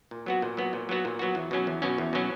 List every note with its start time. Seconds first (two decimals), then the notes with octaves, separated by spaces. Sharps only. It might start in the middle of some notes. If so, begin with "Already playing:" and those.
0.11 A#2
0.26 F#3 B3 F#4
0.42 A#2
0.57 F#3 B3 F#4
0.73 A#2
0.89 F#3 B3 F#4
1.05 A#2
1.19 F#3 B3 F#4
1.35 E2
1.51 B2 F#3 C#4
1.67 E2
1.82 B2 F#3 C#4
1.98 E2
2.13 B2 F#3 C#4